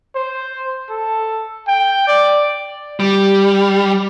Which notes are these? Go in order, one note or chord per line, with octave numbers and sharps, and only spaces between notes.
C5
A4
G5
D5
G3